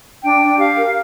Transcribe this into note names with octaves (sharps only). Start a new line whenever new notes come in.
D4 G5
D4
G4 F5
A#4